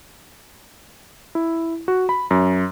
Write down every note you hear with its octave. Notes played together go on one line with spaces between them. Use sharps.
E4
F#4
B5
F#2